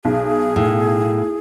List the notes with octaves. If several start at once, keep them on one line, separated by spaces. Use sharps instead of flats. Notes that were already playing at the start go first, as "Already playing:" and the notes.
B1 G#4
A2